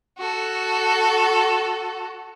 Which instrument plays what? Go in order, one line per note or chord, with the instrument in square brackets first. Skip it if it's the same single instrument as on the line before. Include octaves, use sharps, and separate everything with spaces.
[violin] F#4 A4